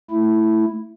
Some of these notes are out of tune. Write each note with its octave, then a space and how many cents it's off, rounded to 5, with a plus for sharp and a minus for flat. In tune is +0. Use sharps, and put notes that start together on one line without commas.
A3 +10 E4 +0